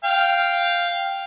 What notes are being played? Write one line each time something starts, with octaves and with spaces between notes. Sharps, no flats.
F5 G5